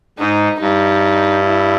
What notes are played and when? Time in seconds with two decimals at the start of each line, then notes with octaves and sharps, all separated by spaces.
0.18 G#2 D#4
0.60 G2 D#4
1.44 E4